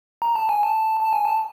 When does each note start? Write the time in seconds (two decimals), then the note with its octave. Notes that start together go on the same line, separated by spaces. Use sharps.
0.22 A#5
0.35 A5
0.49 G#5
0.63 A5
1.01 A5
1.13 G#5
1.25 A5